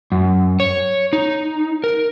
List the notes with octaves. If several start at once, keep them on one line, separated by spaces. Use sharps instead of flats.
F#2
C#5
D#4
A#4